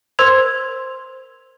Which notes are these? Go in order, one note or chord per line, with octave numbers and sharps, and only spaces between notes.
A#4 C5 C6 E6 G#6 F7